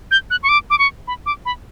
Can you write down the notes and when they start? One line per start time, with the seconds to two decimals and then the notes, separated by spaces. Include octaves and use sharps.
0.11 G6
0.30 F#6
0.43 C#6
0.49 D6
0.70 D6
0.79 C#6
1.08 B5
1.26 D6
1.46 B5